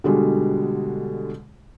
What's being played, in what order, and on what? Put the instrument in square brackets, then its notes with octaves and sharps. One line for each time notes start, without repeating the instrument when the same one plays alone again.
[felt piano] B2 D3 G3 G#3